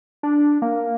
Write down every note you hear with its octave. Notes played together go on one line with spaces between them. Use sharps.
D4
A#3